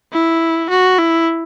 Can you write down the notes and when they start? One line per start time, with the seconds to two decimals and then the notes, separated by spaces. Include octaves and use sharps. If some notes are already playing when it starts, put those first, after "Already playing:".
0.13 E4
0.70 F#4
0.98 E4